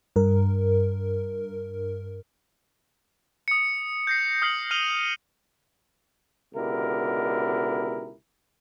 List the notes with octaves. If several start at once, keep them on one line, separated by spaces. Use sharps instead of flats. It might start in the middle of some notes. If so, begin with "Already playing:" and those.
G2 A#4
D#6 C#7
G6 A#6 C7
D#6 F6 G6 C7 F#7
F6 D#7 F7 G7
C#2 B2 D3 E4 G4 A#4